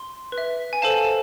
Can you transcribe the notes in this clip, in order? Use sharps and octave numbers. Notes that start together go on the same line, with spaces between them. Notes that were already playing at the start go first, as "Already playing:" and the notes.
Already playing: C6
B4
E5
G#5
A4 C5 F5 A5